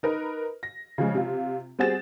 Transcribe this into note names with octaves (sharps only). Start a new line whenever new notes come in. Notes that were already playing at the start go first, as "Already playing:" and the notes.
D#4 A#4 B4
A#6
C#3 F3 G#3
C3 F4
G3 C4 F#4 G#4 A6 E7